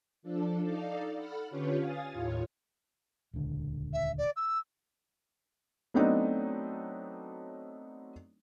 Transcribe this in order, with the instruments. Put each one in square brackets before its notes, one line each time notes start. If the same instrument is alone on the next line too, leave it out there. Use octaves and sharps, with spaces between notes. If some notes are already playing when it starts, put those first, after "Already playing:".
[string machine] F3 D4 A4
D#4 A4 D5 F5
A4 F#5 B5 F6
D3 C#4 F4 G4 B4 C#5
F5 G#5 D#6 A6
D#2 A2 F4 C#5
[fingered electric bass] D#1 C#2 D3
[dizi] E5
D5
E6
[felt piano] F#3 A3 B3 C4 D4 D#4